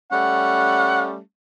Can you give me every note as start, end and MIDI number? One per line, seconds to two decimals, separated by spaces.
0.11 1.17 55
0.11 1.17 57
0.11 1.17 61
0.11 1.06 78